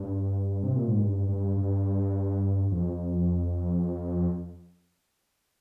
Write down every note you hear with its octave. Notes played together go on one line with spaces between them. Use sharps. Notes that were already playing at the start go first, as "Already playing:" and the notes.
Already playing: G2
C3
A#2
G#2
G2
G2
G2
F2